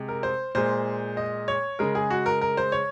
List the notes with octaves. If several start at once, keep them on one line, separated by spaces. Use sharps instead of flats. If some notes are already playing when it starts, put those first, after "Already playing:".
Already playing: C3 G#3
A#4
C5
A#2 G#3 C5
D#5
C#5
C#3 G#3 A#4
G#4
F#4
A#4
A#4
C5
C#5